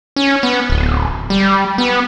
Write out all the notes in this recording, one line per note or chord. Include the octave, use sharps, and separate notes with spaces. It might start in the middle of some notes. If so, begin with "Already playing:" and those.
C#4
B3
D1
G3
B3